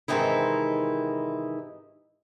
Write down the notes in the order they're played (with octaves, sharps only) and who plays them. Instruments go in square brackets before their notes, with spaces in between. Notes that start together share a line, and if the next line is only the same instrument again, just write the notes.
[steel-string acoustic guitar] G#2 C3 D#3 E3 D#4 E4